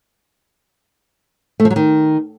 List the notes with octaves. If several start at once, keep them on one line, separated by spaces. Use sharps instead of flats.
A3
F3
F#3
D#3